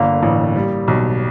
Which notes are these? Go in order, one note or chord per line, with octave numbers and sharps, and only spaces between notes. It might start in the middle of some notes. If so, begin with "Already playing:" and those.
Already playing: G1 D3 A#3
A1
G3
B1